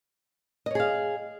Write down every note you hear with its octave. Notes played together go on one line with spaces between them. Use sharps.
G#4 C#5 D#5 F5